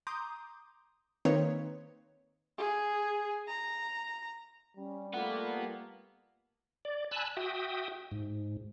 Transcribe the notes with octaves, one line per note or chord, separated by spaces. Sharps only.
A#5 C6 D6 D#6 G6
D#3 A#3 C4 D#4 B4 C#5
G#4
A#5
G3 C#4
A3 A#3 F4 B4 F#5
D5
G#5 A5 B5 E6 F#6
F#4 E5 G5 D#6
G#2